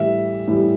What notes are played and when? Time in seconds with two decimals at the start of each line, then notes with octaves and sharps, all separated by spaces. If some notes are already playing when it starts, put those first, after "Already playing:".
Already playing: A2 E3 G3 E5
0.48 A2 E3 G3